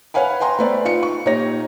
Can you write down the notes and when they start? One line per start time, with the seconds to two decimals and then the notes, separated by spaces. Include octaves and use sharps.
0.14 B4 C#5 F5 F#5 G#5 B5
0.40 G5 G#5 A#5 C6
0.59 A3 B3 B4 C5 D5
0.85 D#4 F4 C#7
1.03 C#6
1.25 A#2 D#4 G4 C#5 A#6